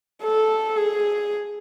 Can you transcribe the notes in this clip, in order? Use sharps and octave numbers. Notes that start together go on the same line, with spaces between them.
A4
G#4